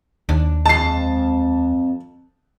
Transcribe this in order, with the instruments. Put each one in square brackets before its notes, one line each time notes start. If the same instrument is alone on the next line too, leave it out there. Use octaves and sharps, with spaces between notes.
[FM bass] D#2 [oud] D4
[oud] F2 G#3 [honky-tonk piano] A5 C7